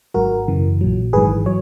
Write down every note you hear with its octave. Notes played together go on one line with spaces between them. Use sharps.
G#1 G#2 F#3 F#4 A#4
F#2 C#3 E3
A#1 A#2 F#3
G#1 G#2 E3 G#4 B4
F#3 C#5